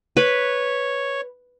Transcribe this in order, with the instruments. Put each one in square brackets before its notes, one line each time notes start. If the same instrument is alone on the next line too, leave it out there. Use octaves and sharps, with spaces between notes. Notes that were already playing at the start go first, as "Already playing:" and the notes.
[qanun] B4 [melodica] C#5